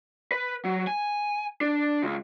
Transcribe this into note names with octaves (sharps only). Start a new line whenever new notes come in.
B4
F#3
G#5
D4
C#2